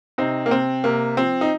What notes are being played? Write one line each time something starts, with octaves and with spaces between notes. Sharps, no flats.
C3 C4 D#4
A#3
C3 C4
C3 A#3
F3 C4
D#4